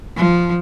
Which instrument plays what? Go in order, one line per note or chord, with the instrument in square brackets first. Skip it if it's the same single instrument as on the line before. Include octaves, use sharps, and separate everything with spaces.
[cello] F3